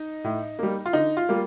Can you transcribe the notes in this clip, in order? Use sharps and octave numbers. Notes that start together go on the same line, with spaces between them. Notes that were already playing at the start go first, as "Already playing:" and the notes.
Already playing: D#4
A2
G3 A#3
F4
D3 D#4
F4
G3 A#3